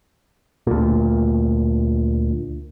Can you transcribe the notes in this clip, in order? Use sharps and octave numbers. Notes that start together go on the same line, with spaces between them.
D2 A#2